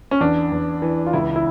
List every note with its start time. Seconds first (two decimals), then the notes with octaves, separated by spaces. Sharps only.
0.11 C#4
0.21 E2 D4
0.52 E2
0.82 E3
1.06 F4
1.13 C#2 E4
1.36 E4